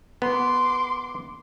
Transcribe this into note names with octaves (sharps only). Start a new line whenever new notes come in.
B3 C6 D6